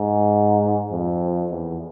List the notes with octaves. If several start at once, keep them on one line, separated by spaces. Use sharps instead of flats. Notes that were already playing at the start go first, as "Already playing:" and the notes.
Already playing: G#2
F2
E2